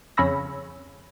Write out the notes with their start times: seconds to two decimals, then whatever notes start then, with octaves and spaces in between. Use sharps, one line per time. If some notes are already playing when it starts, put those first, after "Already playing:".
0.17 F2 C#3 C#5 B5 E6 A#6